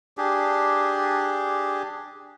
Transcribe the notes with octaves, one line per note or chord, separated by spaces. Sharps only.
D4 G4 G#4